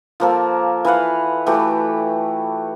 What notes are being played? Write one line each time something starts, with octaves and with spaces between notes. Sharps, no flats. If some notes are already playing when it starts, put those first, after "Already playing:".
F3 A#3 A4
E3 B4 F5 F#5
E3 A3 F#4 G4